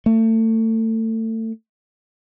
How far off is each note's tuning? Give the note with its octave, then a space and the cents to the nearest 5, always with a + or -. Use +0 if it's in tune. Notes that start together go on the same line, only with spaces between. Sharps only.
A3 +30